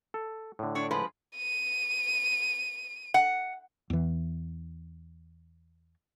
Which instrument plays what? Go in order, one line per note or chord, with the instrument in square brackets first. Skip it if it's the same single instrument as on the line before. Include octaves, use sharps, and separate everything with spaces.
[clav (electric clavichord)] A4
A2 D3
[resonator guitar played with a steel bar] D4 C#5
F3 G#3 B4
[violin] D#7
[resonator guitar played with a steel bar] F#5
[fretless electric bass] E2 E3